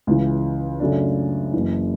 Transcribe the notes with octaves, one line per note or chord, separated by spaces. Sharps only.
C#2 C#3 E3
F#2 C#3 F#3 A3 D4
F#1 F#2 E3